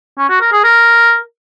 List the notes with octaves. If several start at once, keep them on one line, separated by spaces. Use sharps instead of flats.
C#4
F#4
A#4
G#4
A#4